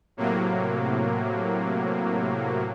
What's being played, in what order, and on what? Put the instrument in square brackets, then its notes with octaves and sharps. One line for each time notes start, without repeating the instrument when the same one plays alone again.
[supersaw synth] A2 C3 F#3 A#3